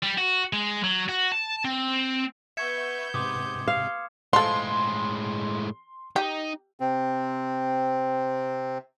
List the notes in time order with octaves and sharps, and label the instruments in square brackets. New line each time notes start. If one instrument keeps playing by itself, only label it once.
[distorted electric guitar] G3
F#4
G#3
F#3
F#4
A5
C4
[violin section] B3 G6 [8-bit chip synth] E5 C#6 [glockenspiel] G#6 C#7 E7
[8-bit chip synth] G#2 C3 [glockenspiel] C6 D6 D#6
[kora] F5
[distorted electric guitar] A2 G#3 [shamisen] F3 A4 [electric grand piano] C6
[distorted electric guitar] D#4 [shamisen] G4
[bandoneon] C3 C4